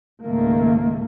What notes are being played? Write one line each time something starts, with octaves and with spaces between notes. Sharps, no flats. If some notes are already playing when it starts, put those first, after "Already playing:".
C#2 G#2 D#3 A3 A#3